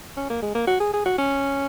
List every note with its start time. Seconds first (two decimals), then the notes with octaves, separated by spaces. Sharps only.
0.17 C#4
0.30 A#3
0.42 G#3
0.55 A#3
0.68 F#4
0.80 G#4
0.93 G#4
1.05 F#4
1.18 C#4